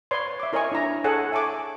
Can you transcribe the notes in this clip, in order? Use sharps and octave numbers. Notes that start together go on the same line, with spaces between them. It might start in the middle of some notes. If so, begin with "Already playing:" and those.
B4 C#5 D5 C6
E5 D6
E4 A#4 C#5 D#5 G#5 C#6
D4 E4 A#5
G#4 A4 C#5 F#5 G#5 A5
E5 G#5 A5 C#6 D6